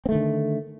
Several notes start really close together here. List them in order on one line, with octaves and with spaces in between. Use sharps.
C4 A3 D#3 D3